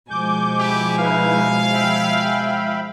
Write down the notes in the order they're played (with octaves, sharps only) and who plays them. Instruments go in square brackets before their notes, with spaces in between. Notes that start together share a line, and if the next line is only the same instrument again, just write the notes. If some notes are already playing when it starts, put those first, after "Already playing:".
[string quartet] B2 G#5 C#6 [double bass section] F3 G#3 [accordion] D6 G6
[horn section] E4 G4
[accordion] D#4 E4 B4 [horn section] F5
[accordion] E5 G5 B5